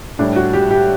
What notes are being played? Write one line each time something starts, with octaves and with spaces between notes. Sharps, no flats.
A2 G3 D4
F#4
G4
G4